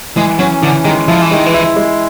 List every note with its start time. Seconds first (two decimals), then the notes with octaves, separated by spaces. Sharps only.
0.17 E3 G#3
0.39 F#3 C#4
0.62 D3 E3
0.85 D#3 G#3
1.08 F3 E4
1.22 E3
1.31 D#3 G#3
1.46 E3
1.54 E4
1.77 G#3